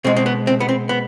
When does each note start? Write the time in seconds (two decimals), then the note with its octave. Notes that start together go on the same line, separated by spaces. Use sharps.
0.04 B2 G#3 C4
0.17 C4
0.26 B3
0.47 C4
0.60 B3
0.69 C4
0.89 B3